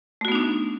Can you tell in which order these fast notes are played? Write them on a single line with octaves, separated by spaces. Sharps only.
A3 F#4 B3 D#4 D4